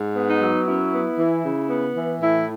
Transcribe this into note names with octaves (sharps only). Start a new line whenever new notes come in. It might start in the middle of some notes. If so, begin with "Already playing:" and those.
Already playing: G#2
B3
D#4
F#3
F#2 E4
B3
E3
C#3
B3
E3
A2 E4